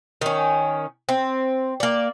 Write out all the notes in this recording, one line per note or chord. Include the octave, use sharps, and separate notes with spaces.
D#3 C#4
C4
A#3 D5